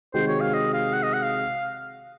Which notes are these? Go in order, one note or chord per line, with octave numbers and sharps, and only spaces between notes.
C3 D#3 G#3 C4 F#4 C5
C#5
F5
D#5
F5
F#5
D#5
F#5
F5